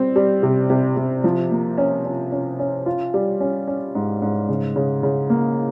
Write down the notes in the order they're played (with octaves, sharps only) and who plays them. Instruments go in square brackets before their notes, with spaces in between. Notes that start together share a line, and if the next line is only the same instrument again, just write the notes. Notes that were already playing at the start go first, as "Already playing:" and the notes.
Already playing: [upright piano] G3 C4
G3
C3
C3
C3
F3
A#3
C#4
C#4
C#4
C#4
F4
G3
C#4
C#4
G#2
G#2
C#3
C#3
C#3
A#3